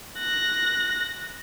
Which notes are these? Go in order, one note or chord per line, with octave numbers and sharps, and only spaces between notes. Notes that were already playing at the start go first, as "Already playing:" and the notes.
F#6 A#6